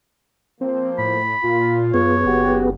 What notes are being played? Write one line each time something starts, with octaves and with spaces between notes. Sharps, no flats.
F3 A#3 C4 C5
A2 B5
A#2 F4
F#2 B3 G#4 B4 C#5
F#1 F#4 G4